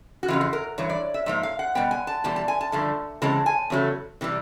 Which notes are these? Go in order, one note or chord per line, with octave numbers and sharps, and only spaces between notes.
F#4
F2 C#3 E3 F4
F4
A#4
G2 E3 C#5
D5
E5
G#2 F3 A#3 E5
F5
F#5
B2 G3 B3 G5
G#5
A5
E2 B2 G3 A5
A5
G#5
A5
G2 D3 F3 A3
C#3 E3 G#3 C4 A5
G#5
E2 C#3 F#3 A3
C3 E3 G3